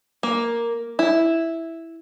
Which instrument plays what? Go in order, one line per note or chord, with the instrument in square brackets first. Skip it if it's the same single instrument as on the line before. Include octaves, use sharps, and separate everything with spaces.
[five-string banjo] A#3
E4